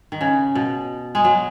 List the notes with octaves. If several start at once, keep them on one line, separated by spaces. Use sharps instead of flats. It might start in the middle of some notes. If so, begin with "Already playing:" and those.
D#3
C#3
B2
G#3
F#3